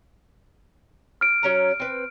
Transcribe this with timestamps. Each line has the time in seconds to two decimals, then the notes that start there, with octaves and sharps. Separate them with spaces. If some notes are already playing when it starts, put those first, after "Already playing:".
1.21 F6 D7
1.43 F#3 C#4 A#5
1.80 C4 B4